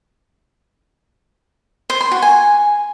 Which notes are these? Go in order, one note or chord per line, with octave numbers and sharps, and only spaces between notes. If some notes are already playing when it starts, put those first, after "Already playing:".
C5
C6
F#4
G#5